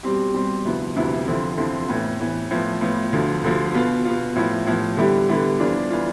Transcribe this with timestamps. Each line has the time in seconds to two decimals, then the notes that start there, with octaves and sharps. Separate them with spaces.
0.03 B2 G3 C4 G4
0.34 B2 G3 C4 G4
0.65 D2 C3 F3 B3 E4
0.96 D2 C3 F3 B3 E4
1.27 F2 D3 F3 C4 E4
1.57 F2 D3 F3 C4 E4
1.88 A2 E3 B3
2.20 A2 E3 B3
2.50 A2 F3 B3
2.81 A2 F3 B3
3.12 D2 D3 F3
3.43 D2 D3 F3
3.74 B2 B3 F4
4.05 B2 B3 F4
4.35 A2 F3 B3 E4
4.66 A2 F3 B3 E4
4.97 D3 G3 B3 E4 G4
5.28 D3 G3 B3 E4 G4
5.59 F2 E3 B3 D4 F4
5.90 E3 B3 D4 F4